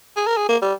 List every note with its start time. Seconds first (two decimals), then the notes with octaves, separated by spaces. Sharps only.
0.16 G#4
0.27 A#4
0.37 G#4
0.49 A#3
0.62 G3